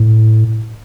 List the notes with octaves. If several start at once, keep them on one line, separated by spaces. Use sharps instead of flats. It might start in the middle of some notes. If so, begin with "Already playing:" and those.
Already playing: A2